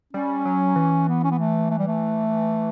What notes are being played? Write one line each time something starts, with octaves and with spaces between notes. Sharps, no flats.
G3 C#4
F#3
E3
B3
C#4
B3
A3
A3
G3
A3